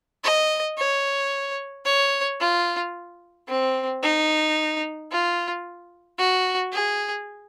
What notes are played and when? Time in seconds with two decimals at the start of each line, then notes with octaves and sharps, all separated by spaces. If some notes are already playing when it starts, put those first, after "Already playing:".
0.24 D#5
0.78 C#5
1.85 C#5
2.41 F4
3.48 C4
4.03 D#4
5.11 F4
6.19 F#4
6.73 G#4